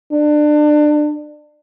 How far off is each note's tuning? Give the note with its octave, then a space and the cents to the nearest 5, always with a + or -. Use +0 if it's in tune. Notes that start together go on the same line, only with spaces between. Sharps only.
D4 +25